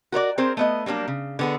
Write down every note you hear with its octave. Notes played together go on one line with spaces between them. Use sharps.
F#4 A#4 C#5 D5
C4 G#4 A#4 C5
A3 B3 D#5
F#3 G3 A#3 D4
C#3
D3 B3 G#4